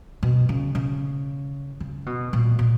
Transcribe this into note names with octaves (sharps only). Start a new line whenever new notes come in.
B2
C#3
C#3
C#3
B2
A#2
A#2